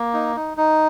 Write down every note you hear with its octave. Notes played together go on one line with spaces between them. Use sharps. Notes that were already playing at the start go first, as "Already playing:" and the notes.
Already playing: A#3
D#4
D#4
D#4